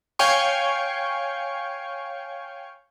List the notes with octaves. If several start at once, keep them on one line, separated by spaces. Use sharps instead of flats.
C#5 F5 G5 G#5 C#6